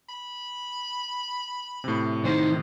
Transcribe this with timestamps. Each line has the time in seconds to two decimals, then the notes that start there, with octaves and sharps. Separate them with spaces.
0.09 B5
1.84 A2 C3
2.25 D#3 C5